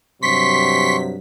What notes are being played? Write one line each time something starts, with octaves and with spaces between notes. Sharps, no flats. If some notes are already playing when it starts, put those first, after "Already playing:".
G2 C3 F#3 C6 C#6 B6